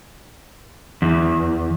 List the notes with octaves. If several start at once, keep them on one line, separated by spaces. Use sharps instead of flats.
E2